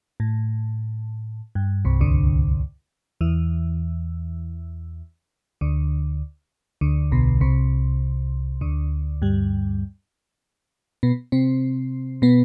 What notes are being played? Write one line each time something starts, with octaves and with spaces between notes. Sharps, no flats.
A2
G2
C2 C3
D2 D3
E2 E3
D2 D3
D2 D3
B1 B2
C2 C3
D2 D3
G2 G3
B2 B3
C3 C4
B2 B3